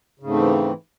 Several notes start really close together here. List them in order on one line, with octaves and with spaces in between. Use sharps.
C#3 G#2 A3 C4 E3